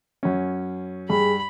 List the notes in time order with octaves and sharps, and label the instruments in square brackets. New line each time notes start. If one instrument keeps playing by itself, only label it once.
[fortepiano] F#2 C#4
[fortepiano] G2 [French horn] G#4 [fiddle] B5